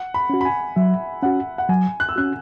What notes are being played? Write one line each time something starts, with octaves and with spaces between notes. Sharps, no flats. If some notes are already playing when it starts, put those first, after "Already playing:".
Already playing: F#5
B5
C#4 F#4
B5
G#5
F#3 E5
C#4 F#4 F#5
F#5
F#3 G#5
F#6
E6
C#4 F#4 F#6